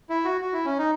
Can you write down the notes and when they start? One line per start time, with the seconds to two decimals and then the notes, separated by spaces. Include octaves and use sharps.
0.10 E4
0.25 F#4
0.41 F#4
0.53 E4
0.65 C#4
0.78 D#4